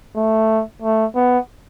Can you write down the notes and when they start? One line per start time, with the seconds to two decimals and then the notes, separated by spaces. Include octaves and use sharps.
0.16 A3
0.82 A3
1.15 B3